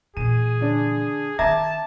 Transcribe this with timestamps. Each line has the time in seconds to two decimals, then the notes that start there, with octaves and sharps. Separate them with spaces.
0.17 A#2 E3 G#4 D#7
0.61 D3 D4
1.39 D#3 C4 E5 A5 A#5 D6 G#6